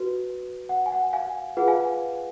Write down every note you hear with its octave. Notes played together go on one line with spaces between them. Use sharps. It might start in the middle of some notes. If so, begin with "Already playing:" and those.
Already playing: F#4 B4
F#5
G#5
F#5
F5 G#5
F4 G#4 B4 F#5
F5 G#5